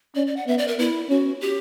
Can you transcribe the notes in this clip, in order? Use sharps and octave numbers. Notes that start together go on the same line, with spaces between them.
C#4 D5
D5
F#5
B3 E5
D5
A#4
B3 E4
C#4 F#4
G4